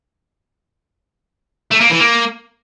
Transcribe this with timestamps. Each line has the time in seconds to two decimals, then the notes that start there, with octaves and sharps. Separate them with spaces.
1.71 A3
1.81 A#3
1.90 E3
2.00 A#3